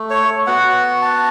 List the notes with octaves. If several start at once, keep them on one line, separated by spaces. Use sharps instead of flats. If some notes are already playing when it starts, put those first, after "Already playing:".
Already playing: A3
C#5
B3 F#4 F#5
A5